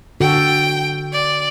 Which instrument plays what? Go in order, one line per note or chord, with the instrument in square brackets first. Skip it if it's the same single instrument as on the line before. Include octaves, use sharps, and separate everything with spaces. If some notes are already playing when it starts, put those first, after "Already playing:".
[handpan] D3 F#4 A4 [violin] G5
[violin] D5